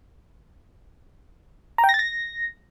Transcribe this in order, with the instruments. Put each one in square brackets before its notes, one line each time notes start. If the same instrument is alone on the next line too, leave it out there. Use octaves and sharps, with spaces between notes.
[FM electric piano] A#5
G5
A#6
A6
A#6